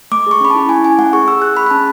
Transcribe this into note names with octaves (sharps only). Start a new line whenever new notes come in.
A3 D6
G#4 C#6
C#4 B5
E4 A5
E4 G#5
C#4 G#5
A3 F#5
G#4 C#6
G#4 E6
G#4 F#6
G#4 B5
B5
C#4 A5